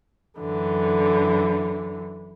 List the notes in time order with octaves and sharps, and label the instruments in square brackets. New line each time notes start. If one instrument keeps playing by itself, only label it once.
[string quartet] F#2 D3 E3